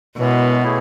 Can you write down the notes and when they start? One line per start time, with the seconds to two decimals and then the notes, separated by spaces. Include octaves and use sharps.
0.17 F#2 B2 E3 G#3 B3
0.62 A2 E3 A3 E4 G#4